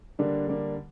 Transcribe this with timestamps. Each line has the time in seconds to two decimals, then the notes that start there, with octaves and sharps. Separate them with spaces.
0.19 D3 G3 A#3 D4
0.48 D3 G3 A#3 D4